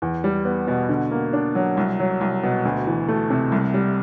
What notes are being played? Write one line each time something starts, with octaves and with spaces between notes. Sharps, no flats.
E2
G3
B3
B2
D3
A#3
D4
F#3
C2
F#3
C2
B2
D2
E3
A3
C3
C2
G3